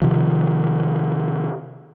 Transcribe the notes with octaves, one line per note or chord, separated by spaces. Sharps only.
C3 D#3 F3